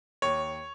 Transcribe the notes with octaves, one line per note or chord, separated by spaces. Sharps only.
D#2 C#5